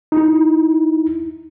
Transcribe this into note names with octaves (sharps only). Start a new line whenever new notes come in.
D#4 E4